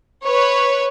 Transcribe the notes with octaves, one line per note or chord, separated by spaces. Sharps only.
B4 C#5